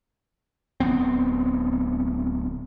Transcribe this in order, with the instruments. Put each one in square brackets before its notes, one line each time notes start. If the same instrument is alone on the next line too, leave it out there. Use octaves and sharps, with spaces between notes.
[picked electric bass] D1 G2 B3 C4